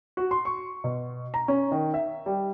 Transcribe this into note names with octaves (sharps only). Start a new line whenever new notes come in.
F#4
C6
C#6
B2
A#5
C#4
D#3
E5
G3